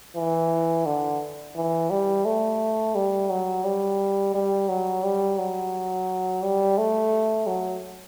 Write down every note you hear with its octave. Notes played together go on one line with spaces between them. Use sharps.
E3
D3
E3
G3
A3
G3
F#3
G3
G3
F#3
G3
F#3
G3
A3
F#3